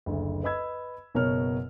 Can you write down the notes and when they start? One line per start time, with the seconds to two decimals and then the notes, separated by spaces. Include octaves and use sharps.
0.06 F#1 D2
0.43 B4 D#5 B5 E6 G#6
1.15 F#1 B2 B3 A#4 C#5 F6